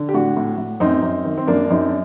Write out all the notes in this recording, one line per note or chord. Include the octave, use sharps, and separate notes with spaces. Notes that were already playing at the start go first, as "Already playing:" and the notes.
Already playing: D3
G4
A2 D4 F#4
A2
A2
F#2 C4 D#4
F#2
D#3
C4
F#2 A#3 D4
D4
F#2 C4 D#4
D4